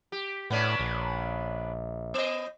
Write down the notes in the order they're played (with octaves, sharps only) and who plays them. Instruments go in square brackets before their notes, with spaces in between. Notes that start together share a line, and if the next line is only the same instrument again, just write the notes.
[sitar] G4
[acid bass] A2 [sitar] B3 C#4 D4
[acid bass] A#1
[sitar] B3 D#5